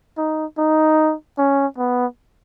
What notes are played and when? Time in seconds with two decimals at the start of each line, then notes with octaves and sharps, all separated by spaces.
0.17 D#4
0.58 D#4
1.38 C#4
1.78 B3